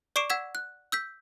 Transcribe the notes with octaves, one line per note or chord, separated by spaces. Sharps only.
D5 C#6 D6 C7 D7 E7
F#5 E6 G#6 B6 E7
F#6
E6 G6 B6